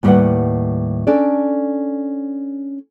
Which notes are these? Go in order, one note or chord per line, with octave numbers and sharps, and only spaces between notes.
D#2 A2 G3 A#4 B4 F#5
C#4 D4 A4 D5